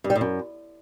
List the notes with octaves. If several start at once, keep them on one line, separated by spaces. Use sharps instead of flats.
G2
G3
A2
F#2